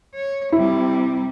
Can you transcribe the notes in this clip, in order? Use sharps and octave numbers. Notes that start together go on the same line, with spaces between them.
C#5
C3 G3 E4